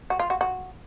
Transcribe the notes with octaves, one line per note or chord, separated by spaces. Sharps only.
F#4
F4
F#4
F#4